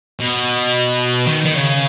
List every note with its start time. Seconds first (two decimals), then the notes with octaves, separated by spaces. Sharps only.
0.21 B2
1.27 D#3
1.45 D#3
1.54 C#3